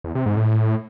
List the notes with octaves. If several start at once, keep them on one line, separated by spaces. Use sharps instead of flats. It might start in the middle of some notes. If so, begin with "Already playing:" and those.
E2
C3
G#2
A2